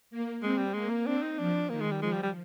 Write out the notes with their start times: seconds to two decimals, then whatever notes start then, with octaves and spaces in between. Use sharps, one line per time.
0.11 A#3
0.42 G#3 C4
0.58 G3
0.74 G#3 A#3
0.90 A#3
1.06 C4 D4
1.22 D#4
1.38 F3 D4
1.70 D#3 A#3
1.81 G#3
1.91 G3
2.02 F3 G#3
2.12 G3
2.23 G3